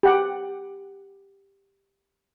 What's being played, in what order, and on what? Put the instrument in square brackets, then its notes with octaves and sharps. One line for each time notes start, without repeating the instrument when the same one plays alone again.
[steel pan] G4 F#5